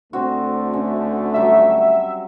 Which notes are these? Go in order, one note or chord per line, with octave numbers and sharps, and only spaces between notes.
D2 D3 A3 C4 F#4
C#4
F#3 G3 E5